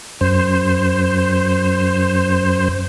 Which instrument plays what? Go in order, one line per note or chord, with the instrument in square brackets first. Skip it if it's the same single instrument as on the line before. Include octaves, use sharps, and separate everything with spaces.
[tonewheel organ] F#2 C5